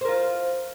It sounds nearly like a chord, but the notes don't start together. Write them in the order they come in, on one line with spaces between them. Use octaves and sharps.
C5 A#4 F4